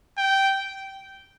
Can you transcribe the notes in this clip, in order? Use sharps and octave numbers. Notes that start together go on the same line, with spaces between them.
G5